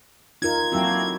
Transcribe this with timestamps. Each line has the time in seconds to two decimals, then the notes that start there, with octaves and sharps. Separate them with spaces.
0.42 D#4 F4 A#4 G#6
0.72 F#3 A3 A#3 C4 E4 F#4